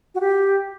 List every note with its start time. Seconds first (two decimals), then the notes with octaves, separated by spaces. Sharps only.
0.15 F#4
0.20 G4